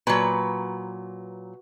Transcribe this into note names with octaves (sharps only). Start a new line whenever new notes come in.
A#2 F#3 B4